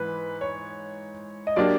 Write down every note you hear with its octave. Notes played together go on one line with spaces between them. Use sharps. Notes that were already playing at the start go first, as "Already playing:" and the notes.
Already playing: G#2 E3 B4
C#5
D#5
F#3 A#3 D4 G4 D5